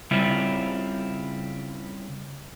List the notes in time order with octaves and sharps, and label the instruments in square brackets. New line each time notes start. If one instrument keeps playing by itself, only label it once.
[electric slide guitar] C#3 G3 C4 E4 F4